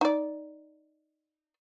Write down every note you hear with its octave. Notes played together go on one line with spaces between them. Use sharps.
D#4 D5